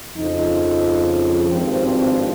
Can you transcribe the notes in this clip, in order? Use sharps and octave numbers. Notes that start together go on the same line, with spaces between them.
F2 C#3 F3 D#4
G#1 G2 F3 C4
C4